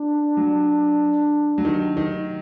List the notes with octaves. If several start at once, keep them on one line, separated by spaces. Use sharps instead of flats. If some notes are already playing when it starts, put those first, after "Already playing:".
Already playing: D4
F#3
F#3
D#3
D#3